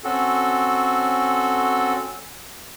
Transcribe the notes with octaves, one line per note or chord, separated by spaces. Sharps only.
C4 C#4 F#4 A4